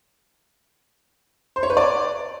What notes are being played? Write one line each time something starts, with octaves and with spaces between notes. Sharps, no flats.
C5
C#5
B4
D5